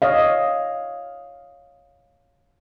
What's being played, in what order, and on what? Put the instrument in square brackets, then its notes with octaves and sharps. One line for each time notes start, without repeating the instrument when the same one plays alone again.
[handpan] C#5 D#5 F5